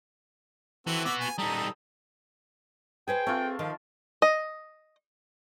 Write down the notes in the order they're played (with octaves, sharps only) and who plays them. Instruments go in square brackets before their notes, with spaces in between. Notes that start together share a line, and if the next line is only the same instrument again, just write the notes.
[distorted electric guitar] E3 [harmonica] C4 F#4 A4
[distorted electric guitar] B3 F#4 [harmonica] D6 E6
[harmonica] G#5
[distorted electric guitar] G3 D#4 [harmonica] A4 A#5 D#6
[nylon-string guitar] G#4 B4 C5 [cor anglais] G5 [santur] G#5
[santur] A3 F4 [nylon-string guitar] C4 G#4
[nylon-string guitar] D#3 [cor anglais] F3
[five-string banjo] D#5